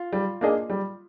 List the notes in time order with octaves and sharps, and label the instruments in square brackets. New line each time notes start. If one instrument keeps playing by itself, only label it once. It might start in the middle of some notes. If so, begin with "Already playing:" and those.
Already playing: [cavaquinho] F4
[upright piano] G3
A#3 D4 G#4 D#5
G3